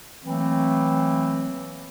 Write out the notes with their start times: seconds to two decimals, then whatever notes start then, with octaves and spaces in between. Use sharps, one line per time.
0.24 E3 F#3 A3 A#3 C4